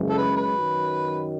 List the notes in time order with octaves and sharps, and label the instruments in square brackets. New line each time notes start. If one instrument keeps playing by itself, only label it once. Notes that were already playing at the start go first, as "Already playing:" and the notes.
Already playing: [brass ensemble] F#1 F#2 E3 G#3 C#4
[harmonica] A4
B4
B4
[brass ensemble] F#2 D#3 F#3